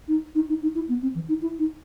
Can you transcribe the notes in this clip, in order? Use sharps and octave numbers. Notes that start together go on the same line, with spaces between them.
D#4
D#4
D#4
D#4
E4
B3
C4
E3
D#4
E4
D#4